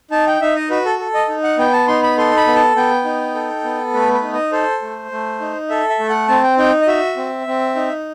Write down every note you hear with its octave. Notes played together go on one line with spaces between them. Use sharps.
D#4 A5
G5
D#4 E5
D#5
F#4 B4
A4
A4
D#5
D#4
F#5
B3 G5
A5
D#4 C6
B5
A4 C6
B5
B3
A5
B3 G5
D#4
A4
B3
A3 B4
B4
D#4
D#5
A4 C5
A3
A3
D#4
A4 E5
E5
A3
F#5
C4 A5
G5
D#4 G5
D#5
F#4 E5
C4
C4
D#4